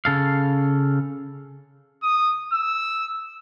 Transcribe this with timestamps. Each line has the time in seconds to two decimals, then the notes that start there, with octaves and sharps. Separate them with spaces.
0.05 C#3 A4 F5
2.03 D#6
2.52 E6